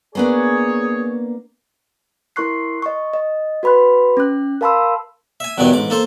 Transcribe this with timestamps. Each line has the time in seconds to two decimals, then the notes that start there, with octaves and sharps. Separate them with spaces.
0.15 A#3 B3 D4 G#4 C#5
2.36 E4 A#4 C6 C#6 F#6 C7
2.82 D#5 C#6
3.14 D#5
3.63 F#4 B4 B5 C6 F#6
4.17 C#4 F#6
4.61 A#4 F5 A5 B5 C6 E6
5.40 E5 G#5
5.58 E2 G2 B2 D#3 F#3 G#5
5.73 A1 G#2 D6
5.90 A#3 A4 C5